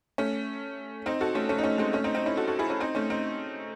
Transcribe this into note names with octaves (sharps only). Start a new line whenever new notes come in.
A3 C#4
C4 D#4
F#4 A4
A3 C#4
A3 C#4
D#4
A3 C#4
G#3 C4
A3 C#4
C4 D#4
C4 D#4
C#4 E4
F#4 A4
F#4 A4
E4 G#4
C#4 E4
C4 D#4
A3 C#4
C4 D#4